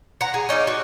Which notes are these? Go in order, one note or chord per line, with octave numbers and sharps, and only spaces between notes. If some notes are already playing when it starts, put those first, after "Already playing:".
F#5 A#5
G#4
C#4 D#4 D5 F5
F#4